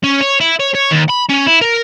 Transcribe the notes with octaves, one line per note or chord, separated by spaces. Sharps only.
C#4
C#5
E4
C#5
C#5
D#2
B5
C#4
E4
A#4